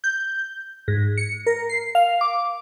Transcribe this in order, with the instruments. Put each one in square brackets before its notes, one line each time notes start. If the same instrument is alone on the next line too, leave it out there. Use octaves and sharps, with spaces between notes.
[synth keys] G6
G#2
C#7
A#4
C7
F5
D6